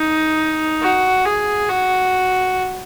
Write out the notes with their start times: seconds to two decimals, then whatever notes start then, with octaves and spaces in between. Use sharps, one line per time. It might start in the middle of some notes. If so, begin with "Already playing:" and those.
Already playing: D#4
0.82 F#4
1.25 G#4
1.69 F#4